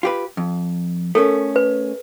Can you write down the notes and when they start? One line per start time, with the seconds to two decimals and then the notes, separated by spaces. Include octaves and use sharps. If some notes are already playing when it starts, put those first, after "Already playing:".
0.03 F4 G4 B4
0.37 F2
1.15 A3 C#4 A4 A#4
1.56 B4